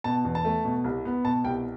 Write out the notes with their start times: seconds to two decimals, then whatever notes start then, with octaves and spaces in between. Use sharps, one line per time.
0.04 B2 A5
0.25 E2
0.35 A5
0.45 A3
0.65 B2
0.84 C2
1.05 B3
1.24 B2 A5
1.44 C2 G5